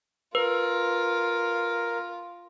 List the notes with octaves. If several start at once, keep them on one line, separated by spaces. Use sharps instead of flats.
F4 A#4 B4